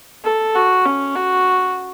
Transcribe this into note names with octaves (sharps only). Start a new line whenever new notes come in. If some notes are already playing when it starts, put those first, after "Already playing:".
A4
F#4
C#4
F#4